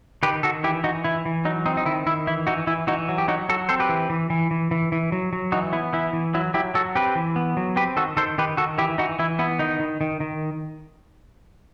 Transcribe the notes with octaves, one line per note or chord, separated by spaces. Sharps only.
D#3 G4 B4
D#3 F#4 A4
E3 E4 G4
E3 D#4 F#4
E3 E4
E3
F#3 D#4
C4 D#4
D#4
D#3 E4
D#3 E4
E3 E4
E3 D#4 F#4
E3 E4
E3 D#4 F#4
F#3
G4
F#3 D#4 F#4
F#3 F#4 A4
C4 A4 C5
G4 B4
E3
E3
E3
E3
E3
E3
F#3
F#3
E3 D#4 F#4
B3 E4
E3 E4
E3
F#3 E4
F#3 E4 G4
F#3 F#4 A4
C4 G4 B4
E3
B3
F#3
C4 G4 B4
D#3 F#4 A4
D#3 A4 C5
D#3 G4 B4
D#3 F#4 A4
E3 E4 G4
E3 D#4 F#4
E3 E4
B3 E4
D#3 D#4
D#3
D#3
D#3